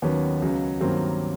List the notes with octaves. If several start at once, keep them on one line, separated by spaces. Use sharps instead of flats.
D#2 D#3 F#3 B3 C#4
C#2 C#3 F#3
G2 D#3 F#3 A#3 C4